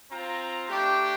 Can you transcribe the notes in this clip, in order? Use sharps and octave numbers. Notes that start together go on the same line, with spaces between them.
C4 F4 A#5
A3 D4 G4